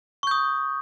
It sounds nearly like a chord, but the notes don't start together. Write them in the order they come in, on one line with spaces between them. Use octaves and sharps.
C#6 G6 D#6